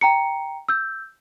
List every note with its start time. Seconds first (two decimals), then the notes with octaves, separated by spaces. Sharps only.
0.01 G5 A#5 C#7
0.69 E6 G6